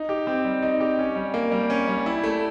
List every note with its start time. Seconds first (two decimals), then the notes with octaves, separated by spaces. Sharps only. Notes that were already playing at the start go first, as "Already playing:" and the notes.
Already playing: D#4
0.09 G4
0.27 C4
0.45 G3
0.62 D#4
0.80 G4
0.99 C#4
1.16 G3
1.34 A#3
1.52 G3
1.70 C#4
1.88 G3
2.06 E4
2.23 A3